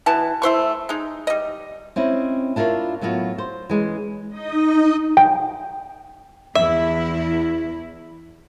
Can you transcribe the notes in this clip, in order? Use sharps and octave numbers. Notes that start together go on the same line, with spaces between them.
B2 E3 A5
A3 E4 C5 C#6
G#3 D#4
G3 D#5
C4 C#4 E4 D#5
D4 E4 F4 A#4 C#5
A2 F#3 B3 F4 F#4
C5
E3 G#3 C#4
D#4 D#5
G5
E2 E4 E5